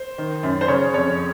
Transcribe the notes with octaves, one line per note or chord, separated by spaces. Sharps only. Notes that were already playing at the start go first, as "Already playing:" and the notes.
Already playing: C5
D#3
F#2
C5
C#3 C#5
F2 C#5